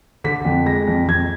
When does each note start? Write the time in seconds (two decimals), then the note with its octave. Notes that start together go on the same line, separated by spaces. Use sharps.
0.24 D3 B6
0.45 F2
0.66 G#3 A#6
0.88 F2
1.08 F2 G#6